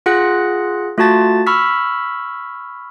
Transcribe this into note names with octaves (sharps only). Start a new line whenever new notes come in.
F4 G#4 F#5 F#6 A#6
A3 F4 F#4 A5 A6
B5 C#6 E6 F6 B6